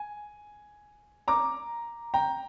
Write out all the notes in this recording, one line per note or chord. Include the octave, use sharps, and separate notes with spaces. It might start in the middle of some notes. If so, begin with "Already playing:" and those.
Already playing: G#5
A#5 D6
G5 A#5